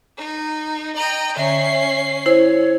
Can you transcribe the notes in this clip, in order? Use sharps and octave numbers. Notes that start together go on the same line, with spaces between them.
D#4
D#5 G5 A#5
D3 C#4 E5 C7
E4 C5 C#5